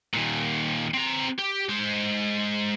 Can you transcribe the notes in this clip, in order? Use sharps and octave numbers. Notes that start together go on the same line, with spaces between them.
D#2 A#2
C4 A#5
G4
G#3 C5